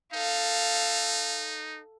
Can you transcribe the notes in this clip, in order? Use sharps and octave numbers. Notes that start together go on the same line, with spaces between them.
D#4 A4 F5